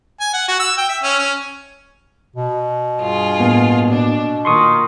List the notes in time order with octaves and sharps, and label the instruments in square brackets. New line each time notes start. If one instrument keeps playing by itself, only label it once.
[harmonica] G#5
F#5
F#4
E6
G5
E5
C#4
C#4
[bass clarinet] B2
[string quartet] G2 F4 G#4
[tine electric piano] A2 A#3 B3
[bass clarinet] B2 [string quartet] D4
[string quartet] A#2 D#3 [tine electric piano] C6 C#6 D#6